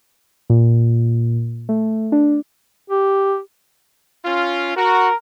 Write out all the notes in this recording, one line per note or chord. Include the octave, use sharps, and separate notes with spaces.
A#2
A3
D4
G4
C#4 F4
F#4 A#4